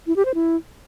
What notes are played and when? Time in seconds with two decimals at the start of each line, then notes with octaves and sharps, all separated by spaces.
0.07 E4
0.16 G4
0.25 C5
0.34 E4